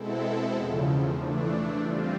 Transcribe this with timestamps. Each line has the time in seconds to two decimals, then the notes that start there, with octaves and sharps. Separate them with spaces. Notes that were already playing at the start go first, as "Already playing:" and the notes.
Already playing: B2 G#3 C4 E4 A4
0.53 E2 C#3 F3
1.16 E3 A3 D4
1.80 G3 C4 F4